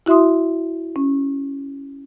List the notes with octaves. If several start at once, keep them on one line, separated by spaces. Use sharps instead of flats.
E4 F#4 E5 C6 D#6
C#4